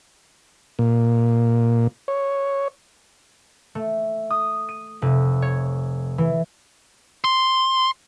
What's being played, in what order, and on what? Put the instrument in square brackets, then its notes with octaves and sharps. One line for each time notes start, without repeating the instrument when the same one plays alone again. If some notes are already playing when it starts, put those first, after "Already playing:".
[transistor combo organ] A#2
C#5
[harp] A3
D#6
D#7
F1
C#5
E3
[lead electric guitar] C6